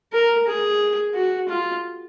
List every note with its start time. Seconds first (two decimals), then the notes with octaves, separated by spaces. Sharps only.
0.13 A#4
0.47 G#4
1.15 F#4
1.49 F4